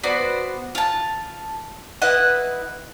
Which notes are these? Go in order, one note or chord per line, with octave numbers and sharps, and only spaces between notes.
B3 F#4 C5 D5
F4 A5
E4 B4 D#5 F#5